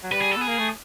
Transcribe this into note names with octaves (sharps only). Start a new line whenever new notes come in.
F#3
G3 B4
G#4
A4
B3 G#4
A#3
A3